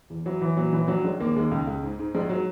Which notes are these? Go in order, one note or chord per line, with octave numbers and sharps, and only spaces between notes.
E2
E3 F#3
E3
A#2 F#3
A#1 E3
A#1 F#3
A#1 G#3
D#2 A#3
D#2 G#3
C#2
C#2
G#2
G#2
A#1 G#3
F#3